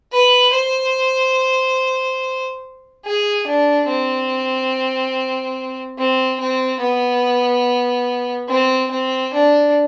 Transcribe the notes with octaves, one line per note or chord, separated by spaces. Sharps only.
B4
C5
G#4
D4
C4
C4
C4
B3
C4
C4
D4